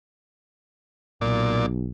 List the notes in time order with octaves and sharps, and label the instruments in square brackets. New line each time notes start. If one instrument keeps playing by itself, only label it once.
[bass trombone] B1 [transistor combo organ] A#2 D5